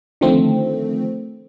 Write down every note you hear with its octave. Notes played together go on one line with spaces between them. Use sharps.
D3 D#3 F3 A3 C4